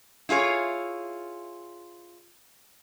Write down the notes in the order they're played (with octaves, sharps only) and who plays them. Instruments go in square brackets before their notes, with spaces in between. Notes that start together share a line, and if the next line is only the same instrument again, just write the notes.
[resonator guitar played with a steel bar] E4 F4 G#4 C#5